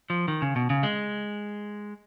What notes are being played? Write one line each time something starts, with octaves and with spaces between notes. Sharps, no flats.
F3
D#3
C#3
B2
C#3
G#3